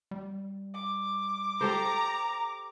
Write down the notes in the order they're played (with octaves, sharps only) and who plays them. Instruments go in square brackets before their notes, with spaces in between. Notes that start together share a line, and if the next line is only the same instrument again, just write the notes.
[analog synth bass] G3
[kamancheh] D6
[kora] G4 A4 C5 [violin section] A#5